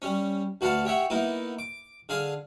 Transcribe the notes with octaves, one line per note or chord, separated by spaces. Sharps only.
G3 C#4
D2 F#4 B4 F5 F#5 A5
G4 C#5 E5 F#5
A#3 B3 D#4 E4
D6
D3 G#4 F5 G#5 D#6